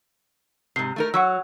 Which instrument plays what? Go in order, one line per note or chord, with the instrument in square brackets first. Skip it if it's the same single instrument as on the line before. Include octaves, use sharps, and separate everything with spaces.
[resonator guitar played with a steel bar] G#2 C3 [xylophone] C7
[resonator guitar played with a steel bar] A3 D#4 A#4
[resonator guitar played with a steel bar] F#3 [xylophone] F#5 C#6 E6